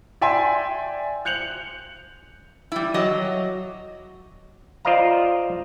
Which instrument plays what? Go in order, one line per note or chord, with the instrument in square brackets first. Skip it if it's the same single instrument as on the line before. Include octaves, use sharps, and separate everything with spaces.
[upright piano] D5 E5 G5 G#5 C6
F#6 G6 C#7 F7 F#7
[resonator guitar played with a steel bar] G3 E4
F#3 D#5
[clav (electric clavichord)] F4 C5 D5 D#5 F5 A#5